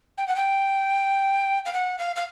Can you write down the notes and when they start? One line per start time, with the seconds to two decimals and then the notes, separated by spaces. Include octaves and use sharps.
0.17 G5
0.27 F#5
0.35 G5
1.65 F5
1.73 F#5
1.98 F5
2.15 F5